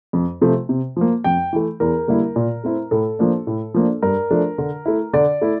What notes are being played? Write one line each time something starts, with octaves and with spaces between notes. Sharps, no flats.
F2
C3 F3 A3
C3
F3 A#3
F2 G5
E3 A3
E2 A#4
D3 G3 A#3 E4
A#2
A3 C4 E4
A2 A4
F3 A#3 D4
A2
F3 A#3 D4
G2 A#4
F3 A3 D4
D3
A3 E4
D3 D5
A3 E4